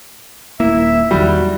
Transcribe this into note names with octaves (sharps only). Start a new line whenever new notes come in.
D#1 A#3 E4 E5 E7
E2 D#3 F#3 G3 F#4